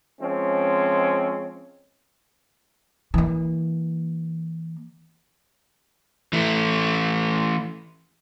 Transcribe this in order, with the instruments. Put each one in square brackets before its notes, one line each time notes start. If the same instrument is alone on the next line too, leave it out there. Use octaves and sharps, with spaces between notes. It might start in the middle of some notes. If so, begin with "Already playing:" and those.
[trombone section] F3 G#3 C4 C#4
[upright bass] E3 A#3
[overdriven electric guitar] E3 A3